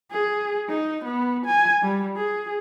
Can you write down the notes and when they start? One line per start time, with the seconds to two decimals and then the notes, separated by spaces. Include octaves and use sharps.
0.12 G#4
0.69 D#4
1.05 B3
1.46 G#5
1.82 G3
2.16 G#4